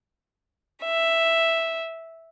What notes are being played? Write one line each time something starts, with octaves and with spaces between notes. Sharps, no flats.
E5